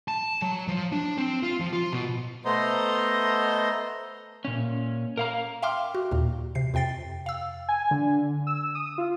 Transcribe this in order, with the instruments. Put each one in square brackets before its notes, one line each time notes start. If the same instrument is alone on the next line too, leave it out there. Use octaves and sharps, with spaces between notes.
[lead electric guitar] A5
F#3
F3
D4
C4
F4
F3
F4
B2
[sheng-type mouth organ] A3 B3 C5 D#5 A#5 C6
[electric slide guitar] A#2 C#4
A#4 F5 A#5
[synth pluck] E5 F5 G5 C6 D6 F6
F#4
D#2 A#2
C3 C7
F2 C3 G5 A6 C7
F5 E6
[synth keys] G#5
D3
E6
D#6
F4